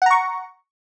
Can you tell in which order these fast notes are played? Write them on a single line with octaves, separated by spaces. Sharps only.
F#5 A#5 C#6